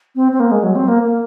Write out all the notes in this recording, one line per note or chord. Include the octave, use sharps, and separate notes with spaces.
C4
C4
A#3
G#3
F#3
C4
A#3
A#3